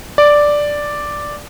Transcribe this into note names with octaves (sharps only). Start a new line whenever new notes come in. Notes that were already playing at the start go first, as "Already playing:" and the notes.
D5